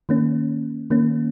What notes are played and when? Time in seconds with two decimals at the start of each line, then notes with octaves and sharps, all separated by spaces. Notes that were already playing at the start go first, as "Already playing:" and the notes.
0.09 D#3 A#3 C#4
0.90 D#3 A#3 C#4